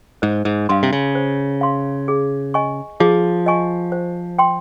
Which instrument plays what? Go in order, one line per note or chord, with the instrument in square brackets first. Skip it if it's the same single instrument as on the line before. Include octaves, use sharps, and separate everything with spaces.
[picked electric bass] G#2 [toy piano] C5
[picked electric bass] G#2
[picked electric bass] G2 [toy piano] F5 C6
[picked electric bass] C3
C#3
[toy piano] C5
F5 C6
G#4
D#5 G#5 C#6
[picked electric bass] F3 [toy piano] G#4
[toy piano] D#5 G#5 C#6
C5
G5 C6